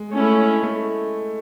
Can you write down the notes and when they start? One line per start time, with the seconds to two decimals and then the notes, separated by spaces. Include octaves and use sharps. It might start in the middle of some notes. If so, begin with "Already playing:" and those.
Already playing: G#3
0.13 A3 C#4 E4
0.63 A3